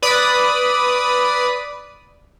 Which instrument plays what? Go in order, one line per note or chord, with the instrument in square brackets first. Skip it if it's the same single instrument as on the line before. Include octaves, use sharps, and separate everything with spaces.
[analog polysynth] B4 D5 B5 D#6